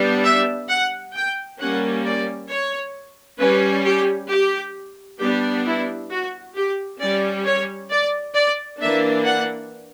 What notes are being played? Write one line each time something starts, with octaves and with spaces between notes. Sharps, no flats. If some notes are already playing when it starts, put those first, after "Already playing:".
Already playing: G3 B3 D4
E5
F#5
G5
G3 A#3 C#4 F#5
D5
C#5
G3 C#4 B4
G4
G4
G3 B3 D4 G4
E4
F#4
G4
G3 C#4 D5
C#5
D5
D5
E3 A#3 D4 E5
F#5